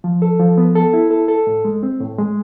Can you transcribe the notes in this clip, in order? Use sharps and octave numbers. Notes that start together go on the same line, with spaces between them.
F3
A4
F3
B3
A4
E4
A4
A4
A2
G#3
C4
A2
G#3